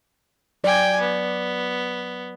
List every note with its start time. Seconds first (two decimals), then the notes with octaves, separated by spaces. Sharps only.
0.64 F#3 D5 G5 G#5
1.00 B3